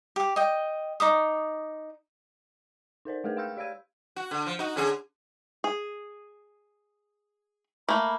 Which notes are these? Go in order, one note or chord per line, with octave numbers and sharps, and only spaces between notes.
G4 D6
D#5 G5
D#4 D6 D#6
D#4 A#4 C5 D5
G#3 A3 G#4 A#4 B4
F5 G5 C6 E6 F6 G6
G4 D5 F5 E6 G#6 D#7
F#4
D3
F3
D#4 F#4
D3 C#4 G#4
G#4
A3 A#3 B5